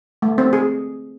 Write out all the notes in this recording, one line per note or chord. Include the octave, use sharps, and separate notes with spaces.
A3
C4
G#4